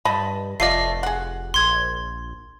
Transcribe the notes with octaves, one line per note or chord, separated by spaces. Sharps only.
G2 D#5 A5 B5
F1 A3 F4 D5 D#5 C7
G#4 F#5
A#1 C6 G#6